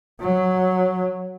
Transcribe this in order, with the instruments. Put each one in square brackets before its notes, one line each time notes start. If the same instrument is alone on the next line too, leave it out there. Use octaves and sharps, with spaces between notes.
[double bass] F#3